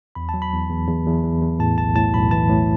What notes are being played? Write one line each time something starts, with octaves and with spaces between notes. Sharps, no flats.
E2 B5
F#3 A5
B5
E2
E2
E2
E2
E2
E2
A2 A5
B1 A5
A2 A5
B1 B5
E3 A5
A2